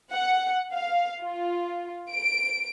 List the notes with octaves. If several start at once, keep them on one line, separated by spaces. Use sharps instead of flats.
F#5
F5
F4
D7